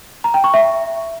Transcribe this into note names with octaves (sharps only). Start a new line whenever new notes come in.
A#5
G5
C#6
E5